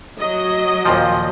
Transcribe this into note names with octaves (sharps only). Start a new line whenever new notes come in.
F#3 D#5
D#2 A#2 F3